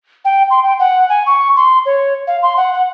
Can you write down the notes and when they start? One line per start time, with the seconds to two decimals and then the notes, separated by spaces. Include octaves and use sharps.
0.25 G5
0.50 C6
0.63 G5
0.80 F#5
1.09 G#5
1.26 C#6
1.56 C6
1.86 C#5
2.27 F5
2.43 C6
2.57 F#5
2.74 F#5